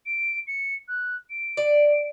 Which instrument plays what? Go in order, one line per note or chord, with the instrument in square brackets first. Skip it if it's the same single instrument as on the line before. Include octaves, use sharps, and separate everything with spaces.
[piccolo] D7
C#7
F#6
D7
[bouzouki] D5